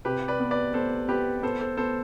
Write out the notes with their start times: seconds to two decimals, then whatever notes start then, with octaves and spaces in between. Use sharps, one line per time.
0.05 C3 G4 B4
0.28 B4 D5
0.40 B3
0.51 B4 D5
0.73 B3 A4 C5
1.08 B3 G4 B4
1.43 B3 A4 C5
1.61 A4 C5
1.77 B3 A4 C5